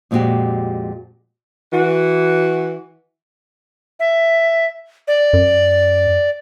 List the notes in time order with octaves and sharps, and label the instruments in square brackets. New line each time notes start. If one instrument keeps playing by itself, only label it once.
[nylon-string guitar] F2 A#2 G#3 D#4 F#4 G4
[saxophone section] E3 F#4
[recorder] E5
D5
[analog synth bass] F#2